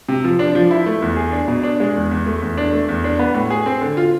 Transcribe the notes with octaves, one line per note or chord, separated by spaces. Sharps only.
C3
F3
D4
F3
E4
A3
E2
G#4
D4
B2
D4
G#3
E2
E2
A3
E2
D4
A3
E2
D4
B3
A2
G#4
C4
D3
F4